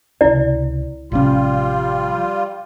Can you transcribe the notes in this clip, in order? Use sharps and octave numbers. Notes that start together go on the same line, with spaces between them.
C#2 C3 E4 D5
A1 C3 F3 G3 C#4 F4